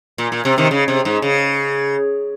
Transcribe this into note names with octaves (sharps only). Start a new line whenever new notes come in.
A#2
A#2
C3
C3 D#3
C#3
C3
G#2
C#3